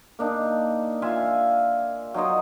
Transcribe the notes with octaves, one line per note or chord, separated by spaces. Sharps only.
A#3 D4 D#4
F4 E5 F5 G#5
F#3 D#4 C5 D#5